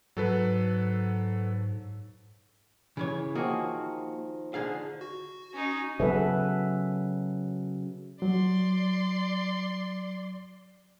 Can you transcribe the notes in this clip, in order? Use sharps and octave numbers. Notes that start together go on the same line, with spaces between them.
G#2 F#3 A4 B4
C#3 E3 C#5
D#3 F3 A#3 F#4 G#4
D3 G#4 F5
F#4
C#4 D#4
C#3 F#3 A4 B4 E5
F#3 D5 C6